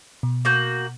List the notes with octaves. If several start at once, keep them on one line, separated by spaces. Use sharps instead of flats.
B2
A#3 F#4 G6